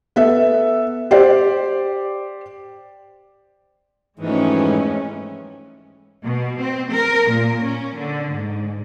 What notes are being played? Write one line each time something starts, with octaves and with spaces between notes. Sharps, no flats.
B3 A4 E5
G4 C5 D5
F2 G#2 E3 G#3 A3 C#4
B2
C4
A#4
A#2
C#4
D3
G#2